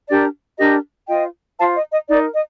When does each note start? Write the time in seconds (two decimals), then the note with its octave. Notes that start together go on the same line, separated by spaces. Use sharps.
0.09 D4 G4 A#4 D5
0.58 D4 G4 A#4 D#5
1.08 F4 C5 D#5 G5
1.58 F4 C5 F5 A5
1.75 D#5
1.91 D#5
2.08 D#4 D5
2.11 A#4
2.33 D#5